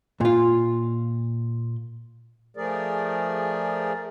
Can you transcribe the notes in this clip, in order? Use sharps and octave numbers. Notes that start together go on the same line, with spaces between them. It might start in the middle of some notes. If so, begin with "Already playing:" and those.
A#2 F4
F3 A3 G#4 A#4 D5